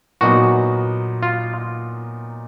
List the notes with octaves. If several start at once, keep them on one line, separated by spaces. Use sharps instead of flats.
A#2 F#3 B3 D#4 F#4
F4